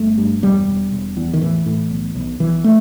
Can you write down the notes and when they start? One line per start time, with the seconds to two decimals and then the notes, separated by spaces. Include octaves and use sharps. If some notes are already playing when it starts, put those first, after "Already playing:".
Already playing: G1 A3
0.18 G2
0.43 E1 G3
0.67 E1
0.92 E1
1.17 E2
1.33 D#3
1.41 A2 E3
1.66 A2
1.90 B1
2.15 B1
2.40 B1 E3
2.64 A3